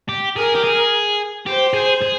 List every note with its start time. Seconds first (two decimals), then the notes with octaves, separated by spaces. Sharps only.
0.09 G4
0.36 G#4 A#4
0.55 G4
0.64 G#4
1.46 G4 C5
1.74 G#4
2.02 G#4